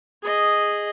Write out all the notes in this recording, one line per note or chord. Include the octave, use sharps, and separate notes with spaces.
G#4 D#5